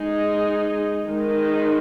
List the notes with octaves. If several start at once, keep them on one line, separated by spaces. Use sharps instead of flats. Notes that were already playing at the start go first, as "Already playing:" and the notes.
Already playing: G#3 D#4 G#4
D#3 G#3 D#4